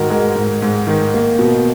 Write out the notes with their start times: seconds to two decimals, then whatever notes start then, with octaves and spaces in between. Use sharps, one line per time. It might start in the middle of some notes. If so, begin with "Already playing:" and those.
Already playing: G#2 D#3 F#4 A#4
0.10 G#3 A#4
0.36 G#2
0.62 G#2
0.87 D#3
1.14 A#3
1.39 B2